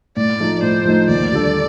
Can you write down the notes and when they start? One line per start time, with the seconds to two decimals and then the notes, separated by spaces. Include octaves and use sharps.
0.17 A2 D5
0.40 F3 A3 D#4
0.62 A2 C5
0.85 F3 A3 D#4
1.08 D#2 D5
1.32 D3 G3 D4 A4